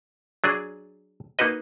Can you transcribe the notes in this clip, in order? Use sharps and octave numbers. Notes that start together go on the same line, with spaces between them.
F#3 D4 G#4
A#3 D#4 F#4 B4 D#5